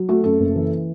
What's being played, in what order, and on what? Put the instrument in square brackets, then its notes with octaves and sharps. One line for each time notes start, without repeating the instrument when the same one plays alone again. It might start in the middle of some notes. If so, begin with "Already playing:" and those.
Already playing: [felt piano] F#3
A3 F#4
F#2 A4
F#1
E3